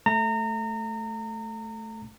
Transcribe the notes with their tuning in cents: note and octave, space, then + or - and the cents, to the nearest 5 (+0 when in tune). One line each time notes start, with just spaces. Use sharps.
A3 -10 A#5 -30